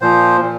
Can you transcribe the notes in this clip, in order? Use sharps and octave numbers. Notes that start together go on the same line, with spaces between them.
A#2 F3 C5
A#2